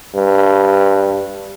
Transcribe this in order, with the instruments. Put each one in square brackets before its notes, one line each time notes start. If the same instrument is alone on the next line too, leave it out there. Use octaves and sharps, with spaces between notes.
[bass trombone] G2